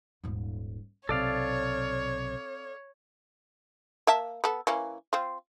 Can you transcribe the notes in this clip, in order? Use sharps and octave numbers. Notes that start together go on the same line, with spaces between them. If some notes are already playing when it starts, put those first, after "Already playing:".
D#1 G#2
B1 C3 C4 A4 C#5 D5 F5
A#3 E5 A5
B3 A4
E3 A#3 C#4
C4 F4